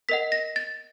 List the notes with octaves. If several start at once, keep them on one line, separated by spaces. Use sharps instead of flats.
A#4 D#5 F#5 B6
A#6
A6